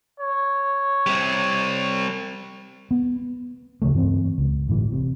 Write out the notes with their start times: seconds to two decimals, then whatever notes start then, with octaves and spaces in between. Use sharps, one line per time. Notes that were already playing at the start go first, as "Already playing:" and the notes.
0.20 C#5
1.06 G3 C4
2.91 B3
3.82 D#2 C#3 F3 A3
3.94 G2 E3 A#3 C4
4.38 C#2
4.68 G1 A2 E3
4.92 C3